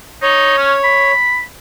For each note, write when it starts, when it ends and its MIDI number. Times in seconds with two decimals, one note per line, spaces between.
0.22 0.57 63
0.22 1.11 73
0.58 0.75 61
0.84 1.42 83